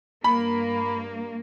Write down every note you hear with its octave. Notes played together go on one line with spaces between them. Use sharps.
G2 A#3 B5